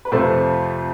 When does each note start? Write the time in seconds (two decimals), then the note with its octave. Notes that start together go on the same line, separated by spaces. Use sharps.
0.05 B4
0.12 F2 C3 F3 A3 A4 C5